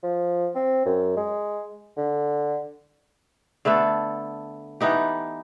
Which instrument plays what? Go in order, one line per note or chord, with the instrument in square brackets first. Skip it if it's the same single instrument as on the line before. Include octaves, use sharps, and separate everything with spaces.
[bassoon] F3
C4
F#2
G#3
D3
[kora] D3 A3 B3 A4
E3 B3 D#4 G4